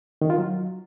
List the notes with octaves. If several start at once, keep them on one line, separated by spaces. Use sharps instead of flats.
D#3
F4
F#3